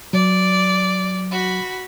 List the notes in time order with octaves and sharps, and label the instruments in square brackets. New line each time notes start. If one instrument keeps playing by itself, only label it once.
[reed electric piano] F#3 [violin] D5
[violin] F#4 B5